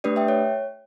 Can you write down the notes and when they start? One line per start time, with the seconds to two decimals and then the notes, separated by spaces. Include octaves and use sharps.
0.04 A3 D4 G4 B4 D5
0.16 E5 G5
0.28 C#5